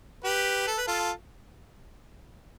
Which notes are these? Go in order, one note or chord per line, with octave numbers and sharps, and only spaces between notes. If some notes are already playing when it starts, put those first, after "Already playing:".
G4 B4
A4
B4
F4 A4